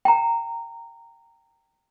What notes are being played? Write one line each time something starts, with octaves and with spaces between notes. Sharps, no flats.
G5 A#5